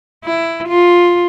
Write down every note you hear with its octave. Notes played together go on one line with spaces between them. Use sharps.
E4
F4